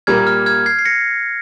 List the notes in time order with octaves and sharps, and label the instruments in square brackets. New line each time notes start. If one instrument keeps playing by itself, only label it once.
[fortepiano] A#2 G3 A#3 [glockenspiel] F6 G#6
[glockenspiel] F6
F6 G#6
G#6 C7
C7
A#6 C#7